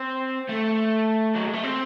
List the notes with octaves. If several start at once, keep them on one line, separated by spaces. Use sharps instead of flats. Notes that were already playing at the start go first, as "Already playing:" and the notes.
Already playing: C4
A3
F#3
G#3
A3
C4